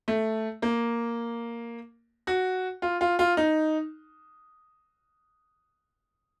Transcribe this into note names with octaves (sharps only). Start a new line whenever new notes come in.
A3
A#3
F#4
F4
F4
F4
D#4